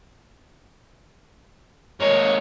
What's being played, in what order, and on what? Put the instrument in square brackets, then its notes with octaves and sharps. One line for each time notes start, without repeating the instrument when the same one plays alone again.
[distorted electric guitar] G#3 A#3 [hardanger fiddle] C#5